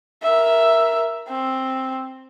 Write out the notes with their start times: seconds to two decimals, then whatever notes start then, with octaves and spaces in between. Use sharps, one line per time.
0.23 A#4 E5
1.28 C4